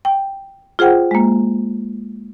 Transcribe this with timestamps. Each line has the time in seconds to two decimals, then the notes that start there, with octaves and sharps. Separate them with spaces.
0.05 G5
0.79 F4 G#4 C5 F#5 G5
1.11 G#3 A#3